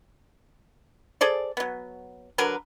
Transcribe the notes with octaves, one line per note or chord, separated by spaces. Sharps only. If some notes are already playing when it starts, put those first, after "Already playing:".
G#4 A4 C5 D5
F#3 B3
D3 F#3 A#4 B4